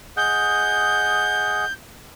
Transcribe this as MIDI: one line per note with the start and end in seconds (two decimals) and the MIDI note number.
0.17 1.65 68
0.17 1.65 75
0.17 1.65 78
0.17 1.72 91